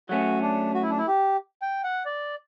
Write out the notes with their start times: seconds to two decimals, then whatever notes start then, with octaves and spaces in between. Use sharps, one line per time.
0.09 F#3 A3 C#4 F#4
0.42 D4
0.74 F#4
0.82 E4
0.90 D4
0.98 E4
1.07 G4
1.62 G5
1.84 F#5
2.06 D5